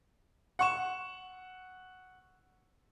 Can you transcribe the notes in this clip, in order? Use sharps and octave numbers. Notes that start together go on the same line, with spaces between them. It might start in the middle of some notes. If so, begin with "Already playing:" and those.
F#5 C#6 E7